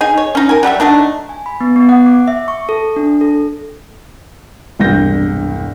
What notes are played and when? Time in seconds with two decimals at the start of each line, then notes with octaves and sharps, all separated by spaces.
0.01 D#4 G#4 G#5
0.18 C#5
0.35 C#4 D#4
0.49 A#4 G#5
0.63 F#3 G3 A#4 E5
0.80 F#3 A3 D4 D#4
1.29 G#5
1.46 B5
1.61 B3
1.76 B3
1.89 F#5
2.06 D6
2.28 E5
2.48 C#6
2.69 A4
2.96 D4
3.21 A4
4.79 E1 C2 G2 G6 A#6